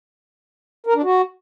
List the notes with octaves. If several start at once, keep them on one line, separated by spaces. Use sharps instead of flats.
A#4
D4
F#4